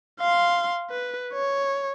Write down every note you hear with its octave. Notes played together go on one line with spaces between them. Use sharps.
F5 C6
B4
C#5